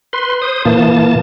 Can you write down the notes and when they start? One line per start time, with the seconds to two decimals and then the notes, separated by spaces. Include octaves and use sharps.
0.13 B4 C6
0.42 C5 D#6
0.65 A#2 E3 A#3 A5